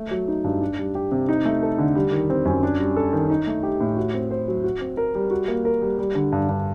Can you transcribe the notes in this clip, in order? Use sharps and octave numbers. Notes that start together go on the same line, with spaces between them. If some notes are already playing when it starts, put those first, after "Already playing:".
Already playing: A3
F#3
D#4
G2
D4
G3
G4
C3
D#4
A3
A4
D3
G3
D#3
C4
F#2
D4
G3
A4
D#3
D#4
A3
G4
A2
F#4
C4
C5
F#3
F#4
C4
A#4
G3
F#4
A#3
A#4
G3
G3
D3
G2
G2